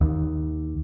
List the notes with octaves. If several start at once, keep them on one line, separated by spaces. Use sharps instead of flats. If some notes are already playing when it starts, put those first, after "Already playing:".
D#2